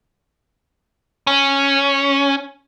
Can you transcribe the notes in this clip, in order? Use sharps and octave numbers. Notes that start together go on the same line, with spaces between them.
C#4